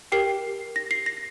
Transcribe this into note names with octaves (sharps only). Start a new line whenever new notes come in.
G4 A#4 G5 C7
A#6
C7
A#6